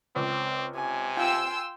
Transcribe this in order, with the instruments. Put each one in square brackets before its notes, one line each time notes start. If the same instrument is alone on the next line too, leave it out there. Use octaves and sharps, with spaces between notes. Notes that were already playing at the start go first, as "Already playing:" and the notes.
[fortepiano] C#2 [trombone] C4
[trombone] C3 [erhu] G#5
[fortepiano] F4 [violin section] G5 C6 E6